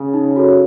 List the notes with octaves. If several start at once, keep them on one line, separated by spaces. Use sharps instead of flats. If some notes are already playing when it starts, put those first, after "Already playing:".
Already playing: C#3
D#4
F#4 A4 C#5